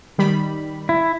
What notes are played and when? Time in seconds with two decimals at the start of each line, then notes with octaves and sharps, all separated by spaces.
0.18 D#3 G3 B5
0.89 E4